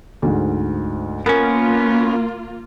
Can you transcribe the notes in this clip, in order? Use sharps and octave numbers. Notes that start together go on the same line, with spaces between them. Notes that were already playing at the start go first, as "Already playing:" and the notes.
D2 G#2
A#3 B3 C#4 F4 A#4